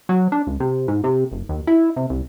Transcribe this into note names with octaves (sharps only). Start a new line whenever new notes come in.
F#3
D4
C#2
C3
G#2
C3
F#1
D#2
E4
C3
C2